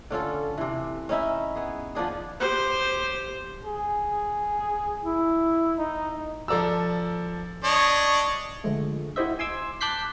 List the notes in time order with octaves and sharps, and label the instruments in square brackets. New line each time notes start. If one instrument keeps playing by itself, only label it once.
[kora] D3 C#4 F4 A4
C3 E3
C#4 D#4 E4 E5
B3 G#4
F3 B3 D4 G#4
[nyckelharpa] G4 C5
[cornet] G#4
[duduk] E4
[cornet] D#4
[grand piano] F3 A4 D5 A#5 E6
[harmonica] D4 C#5 D#5
[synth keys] D3 F3 G#3 A3
E4 F#4 G4 C5 D#5 E5
G#5 C6 D6 E6 G#6
A5 D6 F#6 G6 B6 C7